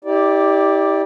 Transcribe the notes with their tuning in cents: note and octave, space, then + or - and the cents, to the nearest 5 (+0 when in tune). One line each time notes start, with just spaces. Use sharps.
E4 -45 G4 +5 D5 +0